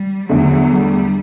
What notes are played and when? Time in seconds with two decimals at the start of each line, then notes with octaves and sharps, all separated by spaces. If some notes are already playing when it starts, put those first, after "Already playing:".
Already playing: G3
0.29 E2 D3 F#3 A3
0.70 G3